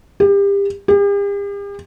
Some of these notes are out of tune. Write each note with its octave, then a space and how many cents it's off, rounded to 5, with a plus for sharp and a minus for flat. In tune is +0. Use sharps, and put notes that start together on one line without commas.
G4 +30
G4 +45